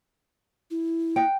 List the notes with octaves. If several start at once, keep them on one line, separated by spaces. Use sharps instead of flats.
E4
F#5 G5